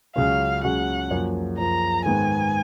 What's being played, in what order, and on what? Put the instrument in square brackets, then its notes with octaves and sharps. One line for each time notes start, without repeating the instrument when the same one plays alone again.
[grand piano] C#2 C#3 F#3 C#4 F#4 [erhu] F5
[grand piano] C#2 C#3 F#3 C#4 F#4 [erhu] F#5
[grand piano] F#2 F3 A#3
[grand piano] F#2 F3 A#3 [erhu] A#5
[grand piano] G#2 D#3 G#3 B3 [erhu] G#5